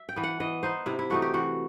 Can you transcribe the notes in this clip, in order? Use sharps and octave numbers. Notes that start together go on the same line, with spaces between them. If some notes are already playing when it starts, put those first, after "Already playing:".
Already playing: E5
G5
E3 B3
F#5
E3 D#5
B3 D#4 C5
C3 E4
E4
E3 A3 D#4 F#4
G4
E3 F#4